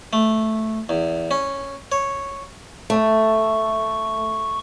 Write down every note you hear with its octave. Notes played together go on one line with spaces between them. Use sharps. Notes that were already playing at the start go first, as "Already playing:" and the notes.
A3
E2
C#4
C#5
A3 C#6